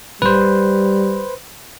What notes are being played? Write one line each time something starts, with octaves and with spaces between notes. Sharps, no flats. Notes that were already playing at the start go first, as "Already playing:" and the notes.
D1 G3 B4 C5